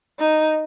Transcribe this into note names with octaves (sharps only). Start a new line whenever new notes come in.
D#4